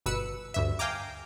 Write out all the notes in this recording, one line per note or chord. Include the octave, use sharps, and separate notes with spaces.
G1 B2 B4 E6 C#7
D2 G2 E5
F5 G5 G#5 A#5 D6